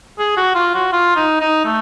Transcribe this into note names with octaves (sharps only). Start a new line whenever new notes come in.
G#4
F#4
F4
F#4
F4
D#4
D#4
A3